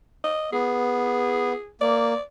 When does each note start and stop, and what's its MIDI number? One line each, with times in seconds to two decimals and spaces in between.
0.24 0.49 75
0.53 1.53 59
0.53 1.70 68
1.81 2.14 58
1.81 2.22 74